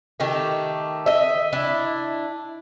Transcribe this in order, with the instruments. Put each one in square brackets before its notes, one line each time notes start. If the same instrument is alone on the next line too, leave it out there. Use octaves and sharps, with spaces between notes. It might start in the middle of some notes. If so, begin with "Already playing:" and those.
[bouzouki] D#3 A3 G4
D#5 E5
D4 E4